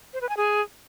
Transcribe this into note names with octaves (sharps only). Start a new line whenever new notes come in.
C5
B4
G#5
G#4